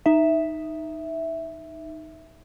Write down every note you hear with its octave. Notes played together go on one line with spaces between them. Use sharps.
D#4 E5